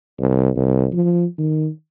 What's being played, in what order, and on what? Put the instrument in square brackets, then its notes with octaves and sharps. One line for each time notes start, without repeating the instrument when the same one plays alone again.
[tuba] C2
C2
F3
D#3